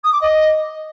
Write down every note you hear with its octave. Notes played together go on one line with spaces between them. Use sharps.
D#6
D6
D#5